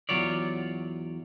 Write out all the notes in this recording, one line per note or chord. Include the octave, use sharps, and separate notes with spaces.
E2 B2 F#3 F4 C#5 D5